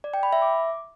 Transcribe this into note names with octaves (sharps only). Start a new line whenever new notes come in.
D5
G5
B5
E5
D6